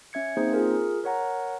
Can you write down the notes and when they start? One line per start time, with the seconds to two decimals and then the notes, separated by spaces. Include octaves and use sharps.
0.13 C#4 E5 G#6 C#7
0.37 A#3 C4 C#4 D#4 G#4 C5
0.53 F4 G#4 A#4
1.04 A#4 C#5 F#5 A#5